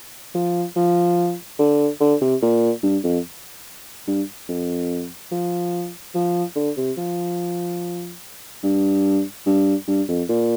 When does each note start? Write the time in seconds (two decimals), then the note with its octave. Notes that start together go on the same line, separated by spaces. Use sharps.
0.34 F3
0.76 F3
1.59 D3
2.00 D3
2.21 C3
2.42 A#2
2.83 G2
3.04 F2
4.07 G2
4.49 F2
5.31 F3
6.15 F3
6.56 D3
6.77 C3
6.97 F3
8.63 G2
9.46 G2
9.88 G2
10.08 F2
10.29 A#2